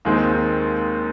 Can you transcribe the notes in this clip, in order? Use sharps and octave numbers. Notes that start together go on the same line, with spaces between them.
D#2 D#3 G#3 C4